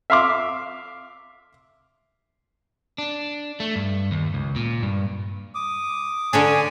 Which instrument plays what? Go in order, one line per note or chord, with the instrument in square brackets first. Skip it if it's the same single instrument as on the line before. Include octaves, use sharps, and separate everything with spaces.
[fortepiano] E5 F5 C6 D6
[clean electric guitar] D4
A3
G2
D#2
C#2
A#2
G2
[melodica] D6 D#6
[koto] D3 C#4 D4 [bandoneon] G#5